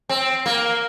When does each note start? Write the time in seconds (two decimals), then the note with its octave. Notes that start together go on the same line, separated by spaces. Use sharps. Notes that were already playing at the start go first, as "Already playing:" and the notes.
0.09 C4
0.46 A#3